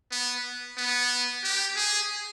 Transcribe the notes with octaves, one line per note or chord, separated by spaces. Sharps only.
B3
B3
G4
G#4